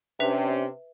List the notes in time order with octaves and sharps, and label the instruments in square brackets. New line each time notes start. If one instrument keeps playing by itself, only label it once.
[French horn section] C3 C#4 D4 [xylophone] B4 E5 F7